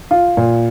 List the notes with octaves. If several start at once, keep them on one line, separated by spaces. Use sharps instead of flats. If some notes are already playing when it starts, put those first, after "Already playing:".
F4
A#2